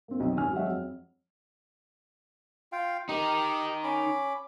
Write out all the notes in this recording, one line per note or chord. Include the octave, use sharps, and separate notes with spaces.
A#3 C4
B1 F2
G#1 C#4 G#5 F6
F#3 G#3 C#5 D#5 E5 F#5
F2
F4 F5 G5
D#4 G4 A#4 D#6
C#4 B5 D6